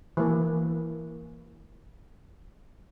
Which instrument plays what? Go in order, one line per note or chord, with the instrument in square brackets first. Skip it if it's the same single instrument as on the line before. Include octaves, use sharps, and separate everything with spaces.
[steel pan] E3 A#3